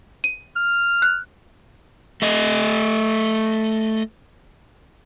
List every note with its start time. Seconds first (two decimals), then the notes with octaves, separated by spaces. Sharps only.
0.24 D#7
0.56 F6
1.02 F#6
2.22 A3 D#5